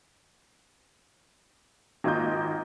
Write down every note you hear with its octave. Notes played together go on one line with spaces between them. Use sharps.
G#1 A#3 F4 D#5 G6